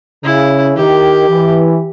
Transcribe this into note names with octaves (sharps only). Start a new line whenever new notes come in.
C#3 E4
D#3 G4
E3